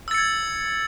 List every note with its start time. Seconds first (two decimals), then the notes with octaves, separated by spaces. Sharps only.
0.08 E6
0.11 A6
0.14 C#7
0.18 G#6